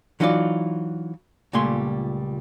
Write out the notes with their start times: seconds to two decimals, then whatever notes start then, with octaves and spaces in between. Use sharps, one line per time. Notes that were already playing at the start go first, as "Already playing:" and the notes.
0.20 E3 F#3 D#4 F4 A4 D5
1.53 C#2 A#2 G3 A3 G#5 C6